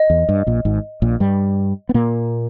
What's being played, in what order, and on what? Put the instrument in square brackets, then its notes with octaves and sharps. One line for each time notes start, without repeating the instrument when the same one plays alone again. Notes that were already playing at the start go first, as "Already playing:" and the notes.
Already playing: [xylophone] D#5
[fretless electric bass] E2
G2
A#1 A#2
G#1 G#2
A#1 A#2
G2 G3
B3
A#2 A#3